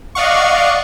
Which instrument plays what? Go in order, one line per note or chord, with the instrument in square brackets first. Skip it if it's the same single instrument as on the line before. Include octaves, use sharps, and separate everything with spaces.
[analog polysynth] D5 D#5 F5 F#5 C#6